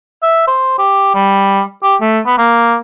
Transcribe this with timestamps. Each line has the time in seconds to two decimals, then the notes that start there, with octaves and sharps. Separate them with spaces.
0.23 E5
0.47 C5
0.79 G4
1.15 G3
1.83 G4
2.01 A3
2.26 B3
2.38 A#3